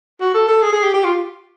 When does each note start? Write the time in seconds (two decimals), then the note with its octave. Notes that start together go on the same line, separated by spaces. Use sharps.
0.21 F#4
0.34 A4
0.48 A4
0.62 G#4
0.73 G#4
0.83 G4
0.94 G4
1.04 F4